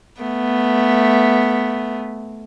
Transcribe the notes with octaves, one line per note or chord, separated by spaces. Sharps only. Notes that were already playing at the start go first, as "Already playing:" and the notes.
A3 B3